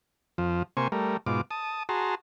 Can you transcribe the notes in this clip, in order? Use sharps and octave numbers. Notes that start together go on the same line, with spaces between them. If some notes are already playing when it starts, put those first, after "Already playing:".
F2 F3
C3 A#3 C5 G#5 C#6
G3 A3 A#4
G#2 B2 F4 D6
A5 D#6
F#4 G#4 A5 A#5 C6